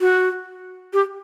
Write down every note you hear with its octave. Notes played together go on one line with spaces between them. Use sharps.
F#4
G4